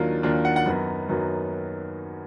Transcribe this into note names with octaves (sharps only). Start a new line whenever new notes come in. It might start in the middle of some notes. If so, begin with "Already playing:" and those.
Already playing: D#2 D#3 F#3 D4 F4
D#2 D#3 F#3 D4 F4
F#5
F#5
F#2 D#3 F#3 B3
F#2 D#3 F#3 B3